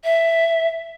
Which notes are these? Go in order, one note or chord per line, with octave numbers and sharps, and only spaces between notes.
E5